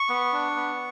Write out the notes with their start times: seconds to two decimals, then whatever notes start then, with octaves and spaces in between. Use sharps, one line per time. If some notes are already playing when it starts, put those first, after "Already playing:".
Already playing: C#6
0.09 B3
0.33 D4
0.56 B3